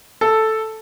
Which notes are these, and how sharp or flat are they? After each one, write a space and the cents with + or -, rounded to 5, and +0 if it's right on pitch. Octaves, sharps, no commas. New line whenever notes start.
A4 +0